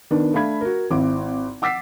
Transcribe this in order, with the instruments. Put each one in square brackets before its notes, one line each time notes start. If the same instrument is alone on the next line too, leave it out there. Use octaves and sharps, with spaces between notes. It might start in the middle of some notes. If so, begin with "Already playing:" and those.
[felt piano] D#3 B3 D4
A3 D4 F5 B5 G#6
F#4 A#4
G#1 C4 E4 D6
F#5 D6 E6 A6 B6 C7